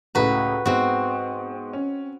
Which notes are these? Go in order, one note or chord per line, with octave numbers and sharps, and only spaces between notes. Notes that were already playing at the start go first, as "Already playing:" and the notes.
C#2 A2 F#4 B4 A#5
G#2 B3 C4 F#4
C#4